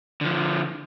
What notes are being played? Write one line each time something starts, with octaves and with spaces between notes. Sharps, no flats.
D3 F3